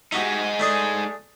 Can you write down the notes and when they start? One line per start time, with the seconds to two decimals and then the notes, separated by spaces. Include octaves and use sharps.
0.12 G#3 D#4 E4 F#4 G4
0.60 A3 D4 G#4